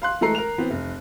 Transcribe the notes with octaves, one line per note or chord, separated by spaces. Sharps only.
F5 C6 F#6
E3 G#3 A3 A4 A#5 C7
A#4 F7
E3 B3 C4
F1